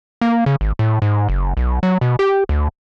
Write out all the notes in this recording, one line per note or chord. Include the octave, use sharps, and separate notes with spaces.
A#3
C#3
G#1
A2
G#2
F#1
B1
F#3
B2
G4
D2